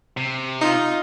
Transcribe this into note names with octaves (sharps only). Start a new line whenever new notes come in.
C3
D#4 F4 D#5